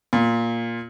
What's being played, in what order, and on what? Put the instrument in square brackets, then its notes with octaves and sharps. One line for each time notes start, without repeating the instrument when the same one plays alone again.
[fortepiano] A#2